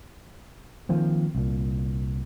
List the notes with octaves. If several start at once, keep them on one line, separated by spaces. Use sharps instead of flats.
D#3 F3 A#3 C4
C2 A#2